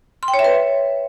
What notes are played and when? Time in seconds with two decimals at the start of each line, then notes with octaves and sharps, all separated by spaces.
0.23 C6
0.28 G5
0.34 C#5
0.39 E5
0.44 B4